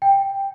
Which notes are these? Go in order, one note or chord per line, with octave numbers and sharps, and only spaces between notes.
G5